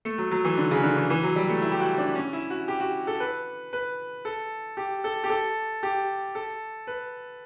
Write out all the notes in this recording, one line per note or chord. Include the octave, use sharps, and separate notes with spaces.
A3
F#3
F#3
E3
D3
C#3
D3
E3
E3
F#3
G3
A3
E4
G4
F#4
D4
C#4
E4
F#4
G4
F#4
A4
B4
B4
A4
G4
A4
G4
A4
G4
A4
B4